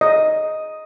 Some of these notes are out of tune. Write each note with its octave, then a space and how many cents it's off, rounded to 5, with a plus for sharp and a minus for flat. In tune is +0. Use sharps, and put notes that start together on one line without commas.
D#5 +5